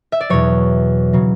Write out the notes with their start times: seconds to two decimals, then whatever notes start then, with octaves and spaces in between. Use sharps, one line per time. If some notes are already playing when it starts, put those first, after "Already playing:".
0.12 E5
0.21 D5
0.30 E2 B2 F#3 C#5
1.13 C#3 F#3